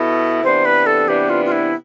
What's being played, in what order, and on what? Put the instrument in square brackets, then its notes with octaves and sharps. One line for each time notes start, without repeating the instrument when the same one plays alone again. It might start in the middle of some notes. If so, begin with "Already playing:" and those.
Already playing: [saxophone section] B2 B3 E4 A4
[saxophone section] C3 E3 B3 D4 [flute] C5
[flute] B4
A4
[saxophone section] C3 E3 B3 D4 [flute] G4
[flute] F4
F4
E4